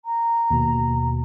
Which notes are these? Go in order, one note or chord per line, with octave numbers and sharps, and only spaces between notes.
A#5
D#2 B2